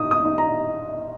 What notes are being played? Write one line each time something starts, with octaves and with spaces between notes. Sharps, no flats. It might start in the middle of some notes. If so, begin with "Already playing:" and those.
Already playing: D#4 D#6
D#6
D#4
A#5